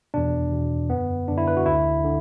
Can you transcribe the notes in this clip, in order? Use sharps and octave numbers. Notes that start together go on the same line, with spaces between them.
E2 B2 D4
E2 B2
F#2 D3 B3
F#2 D3 D4
E4
B4
F#4
D2 D3 E4
D3